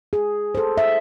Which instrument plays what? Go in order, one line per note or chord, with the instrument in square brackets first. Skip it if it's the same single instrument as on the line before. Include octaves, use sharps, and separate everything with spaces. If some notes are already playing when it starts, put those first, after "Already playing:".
[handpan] G#4
A4 C5
E5